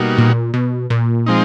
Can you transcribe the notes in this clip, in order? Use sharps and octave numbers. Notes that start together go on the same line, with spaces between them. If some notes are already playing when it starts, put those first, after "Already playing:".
Already playing: B2 G3 A#3 D#4 F#4
A#2
B2
A#2
F3 G#3 C4 D#4